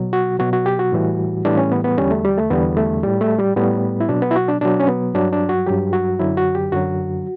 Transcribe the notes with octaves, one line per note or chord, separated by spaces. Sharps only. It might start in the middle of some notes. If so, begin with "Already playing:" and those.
Already playing: B2 F#3
F#4
B2 F#3 F#4
F#4
G4
F#4
A2 E3 G3
A2 E3 G3 D4
C#4
B3
B3
E2 D3 G3 C#4
A3
G3
A3
E2 D3 G3 B3
A3
A2 G3
A3
G3
A2 G3 B3
E4
B2 F#3 D4
B3
E4
F#4
D4
B2 F#3 D4
C#4
B3
G2 F#3 D4
D4
F#4
G2 F#3 G4
F#4
F#2 D3 F#3 E4
F#4
G4
F#2 D3 F#3 F#4